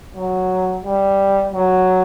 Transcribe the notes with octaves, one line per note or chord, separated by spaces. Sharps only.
F#3
G3
F#3